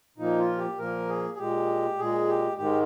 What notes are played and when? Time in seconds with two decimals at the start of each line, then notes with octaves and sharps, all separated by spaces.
0.17 A#2 F3 A#3 D#4
0.39 F4
0.57 G4
0.78 A#2 F3 A#3 A#4
1.09 G#4
1.34 G#4
1.38 A#2 G#3 G4
1.99 A#2 G#3 G#4
2.28 G4
2.58 G#2 D#3 G#3 G4